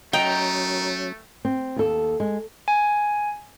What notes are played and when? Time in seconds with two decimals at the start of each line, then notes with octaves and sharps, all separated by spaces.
0.13 F#3 A3 C#4 D#4 F#4 A#4 G5
1.45 C4
1.76 D#2 A4
2.20 G#3
2.68 G#5